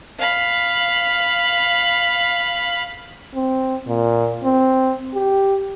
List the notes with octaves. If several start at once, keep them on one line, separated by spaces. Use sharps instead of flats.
F5 B5
C4
A#2
C4
G4